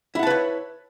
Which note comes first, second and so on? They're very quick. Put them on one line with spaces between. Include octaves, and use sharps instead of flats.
E4 F#5 A5 B4 C#5